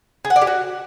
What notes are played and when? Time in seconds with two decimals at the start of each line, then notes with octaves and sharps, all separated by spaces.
0.25 G#4
0.30 F#5
0.36 D5
0.42 G4
0.47 F#4